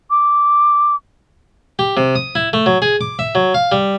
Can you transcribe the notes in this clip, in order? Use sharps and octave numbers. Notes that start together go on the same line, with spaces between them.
D6
G4
C3
D#6
E4
A3
F#3
G#4
D6
E5
F#3
F5
G3